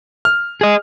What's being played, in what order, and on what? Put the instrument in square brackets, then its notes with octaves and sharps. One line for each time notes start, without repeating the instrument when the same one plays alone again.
[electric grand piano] F6
[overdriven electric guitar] G#4 D#5